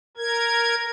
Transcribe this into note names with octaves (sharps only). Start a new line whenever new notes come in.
A#4 G#6